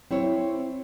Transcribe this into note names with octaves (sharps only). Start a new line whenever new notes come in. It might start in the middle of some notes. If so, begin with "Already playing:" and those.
C4 E4 C5 C#5